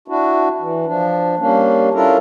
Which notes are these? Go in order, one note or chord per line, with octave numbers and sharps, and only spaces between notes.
D4 E4 F#4
E3
F3 D4
G3 A#3 C#4 D4
C#4 D4 E4 F4 A4 A#4